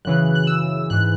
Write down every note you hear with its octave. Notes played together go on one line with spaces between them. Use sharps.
F#2 C#3 E3 F#6
F#6
E6
G#2 E3 F#6